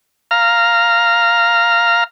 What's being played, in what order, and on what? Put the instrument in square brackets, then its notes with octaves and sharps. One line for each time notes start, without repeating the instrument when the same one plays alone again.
[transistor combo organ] F5 A#5 F6